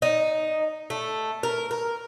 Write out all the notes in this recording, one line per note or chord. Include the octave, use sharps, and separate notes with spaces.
D#4
A3
A#4
A#4